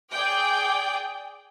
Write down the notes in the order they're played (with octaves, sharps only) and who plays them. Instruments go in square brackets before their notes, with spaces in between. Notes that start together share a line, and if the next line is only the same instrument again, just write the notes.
[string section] G#4 D5 G5